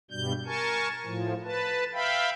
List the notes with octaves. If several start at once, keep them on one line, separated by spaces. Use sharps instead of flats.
G2 B2 G3 G6
A#4 G#5 A5 C#6
A2 F3
B4 A5
E5 F5 G5 B5